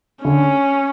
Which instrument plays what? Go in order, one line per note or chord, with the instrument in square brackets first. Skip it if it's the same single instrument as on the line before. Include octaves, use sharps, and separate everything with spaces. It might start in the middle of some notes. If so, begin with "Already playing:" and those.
[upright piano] D3 [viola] C#4